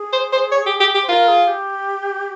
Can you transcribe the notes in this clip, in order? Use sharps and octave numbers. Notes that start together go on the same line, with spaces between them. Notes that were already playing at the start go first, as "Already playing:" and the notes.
Already playing: G#4
C5
C5
C#5
G4
G4
G4
C5
F4 A#4
G#4
G4